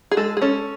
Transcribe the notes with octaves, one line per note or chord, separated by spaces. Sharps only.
G#4
G#3 A4
G#4
C#4 A4